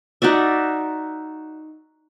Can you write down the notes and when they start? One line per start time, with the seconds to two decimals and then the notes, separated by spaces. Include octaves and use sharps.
0.22 D#4 F#4 D5 E5